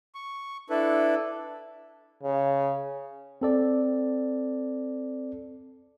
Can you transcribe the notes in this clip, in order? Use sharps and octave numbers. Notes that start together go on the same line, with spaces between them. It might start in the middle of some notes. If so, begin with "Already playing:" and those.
C#6
D4 E4 A4 B4
C#3
C4 A4 D5